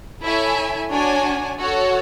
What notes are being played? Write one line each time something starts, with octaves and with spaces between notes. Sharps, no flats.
E4 A4 C#5 E5 G#5
D4 F#4 C#5 G#5
F#4 A4 C#5